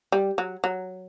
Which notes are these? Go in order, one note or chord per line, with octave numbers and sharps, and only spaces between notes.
G3
F#3
F#3